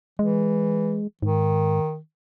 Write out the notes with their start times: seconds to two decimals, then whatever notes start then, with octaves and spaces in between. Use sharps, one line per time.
0.19 E3 G#3
1.22 G#2 D#3